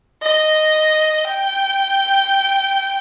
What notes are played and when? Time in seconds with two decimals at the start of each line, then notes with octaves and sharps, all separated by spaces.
0.22 D#5
1.24 G5